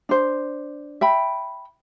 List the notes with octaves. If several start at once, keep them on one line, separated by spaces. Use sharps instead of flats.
D4 C5
E5 G5 B5